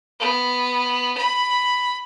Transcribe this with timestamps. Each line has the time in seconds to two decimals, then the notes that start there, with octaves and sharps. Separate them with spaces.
0.20 B3
1.18 B5